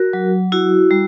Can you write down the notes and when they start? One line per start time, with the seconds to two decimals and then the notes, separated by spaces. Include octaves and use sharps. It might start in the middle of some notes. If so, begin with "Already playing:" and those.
Already playing: F#4 A#4
0.13 F#3
0.52 E4 F#4
0.91 G3